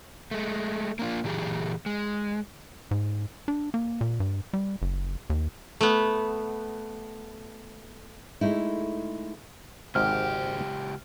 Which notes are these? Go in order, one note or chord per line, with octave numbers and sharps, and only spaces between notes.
G#3 A3
A#3 D4 F4
A#2 E3 G4 G#4
G#3
G#2
D4
A#3
A#2
G2
G3
F#1
D#2
A3 B3
G#3 A3 D#4 E4
G#1 C#2 G#2 C3 G4 F6